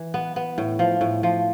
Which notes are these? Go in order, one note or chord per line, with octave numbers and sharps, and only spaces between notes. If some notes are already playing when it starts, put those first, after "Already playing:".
Already playing: E3
B3
B3
A2
F3
A2
F3